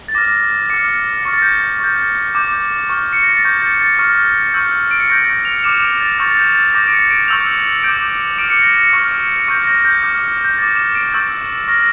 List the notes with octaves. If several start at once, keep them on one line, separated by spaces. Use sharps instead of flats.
A6
D6 F6 A#6
D6 F6 C#7
C#6 F6 A#6
A6
G6
A6
C#6 G6
D6 G6
C#6 F6
C#7
A#6
A6
C#6 G6
A6
G6
A6
C#6 F6
C#6 E6 G6
D7
C#7
C#6 G6 A#6
D7
F7
D6 F6 E7
D7
A6
C#6 E6 G6 A6
A6
G6
A6
D6 G6 A#6
D7
C#7
D7
C#6 E6 G6 F7
D6 G6 D7
D6 F6 D7
C#7
A#6
C#7
C#6 F6
C#6 E6 G6 A#6
A#6
G6
D6 F6
G6
D6 G6 A6
E7
D7
C#6 E6 G6 A6
C#6 F6 A#6